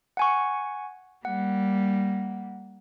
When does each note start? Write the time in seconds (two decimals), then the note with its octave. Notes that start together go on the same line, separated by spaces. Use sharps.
0.17 F#5 G#5 C#6
1.25 G3 A#3 F#5